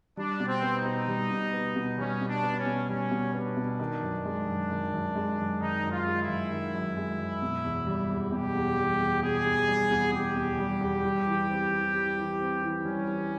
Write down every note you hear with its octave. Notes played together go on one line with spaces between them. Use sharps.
G3 D4
B2
C4
B3
D#4
B2
G3
B2
B3
B2
G3 C#4
B2
D4
B3
C#4
B2
G3 C#4
B2
B3 D4
B2
D#3
F#2
G#3
F#2
D#3
F#2
G#3
F#2
D#3 D#4
F#2
F4
G#3
E4
F#2
D#3
F#2
G#3
F#2
B2
E2
G3
E2
B2 G4
E2
G3
E2
B2 G#4
E2
G3
E2
B2 G4
E2
G3
E2
G3
E3
C4
E3
G3
E3
C4
E3
G3 C#4
E3